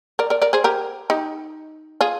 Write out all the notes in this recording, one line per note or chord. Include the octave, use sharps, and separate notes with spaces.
A#4 D5
A#4 D5
A#4 D5
G#4 C5
G4 A#4
D#4 G4
F4 G#4